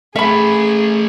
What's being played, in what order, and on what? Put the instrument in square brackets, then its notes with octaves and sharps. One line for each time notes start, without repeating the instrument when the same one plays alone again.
[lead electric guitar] A3 B4 [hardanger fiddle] G#4 [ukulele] E5 B5